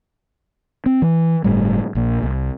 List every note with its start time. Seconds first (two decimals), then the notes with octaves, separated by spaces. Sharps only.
0.86 C4
1.02 E3
1.44 G1 A2 G3
1.95 A#1 A#2
2.23 C2